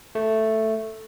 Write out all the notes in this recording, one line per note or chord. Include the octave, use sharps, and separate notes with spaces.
A3